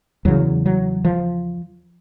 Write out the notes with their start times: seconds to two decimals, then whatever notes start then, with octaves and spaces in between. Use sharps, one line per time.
0.25 E2 C#3 F#3
0.66 F#3
1.05 F3